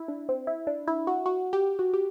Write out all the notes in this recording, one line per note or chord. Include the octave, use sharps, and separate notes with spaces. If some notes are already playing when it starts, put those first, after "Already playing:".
Already playing: E4
D4
C4
E4
D4
E4
F#4
F#4
G4
F#4
G4